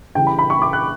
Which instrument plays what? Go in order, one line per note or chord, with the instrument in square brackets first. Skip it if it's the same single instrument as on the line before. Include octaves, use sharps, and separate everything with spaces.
[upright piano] C#3 E3 G3 G5
B5
B5
C#6
D6
F#6